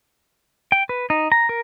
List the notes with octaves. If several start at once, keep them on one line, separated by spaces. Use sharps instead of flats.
G5
B4
D#4
A#5
A#4